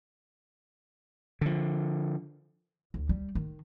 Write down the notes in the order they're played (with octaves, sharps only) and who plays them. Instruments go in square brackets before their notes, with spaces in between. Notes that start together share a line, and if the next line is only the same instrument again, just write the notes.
[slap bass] D3 F3
[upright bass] D2
G3
D#3